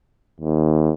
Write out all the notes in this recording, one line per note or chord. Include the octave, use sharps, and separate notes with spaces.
D#2